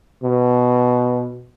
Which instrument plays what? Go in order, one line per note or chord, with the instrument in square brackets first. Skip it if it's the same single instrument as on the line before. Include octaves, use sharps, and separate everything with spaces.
[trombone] B2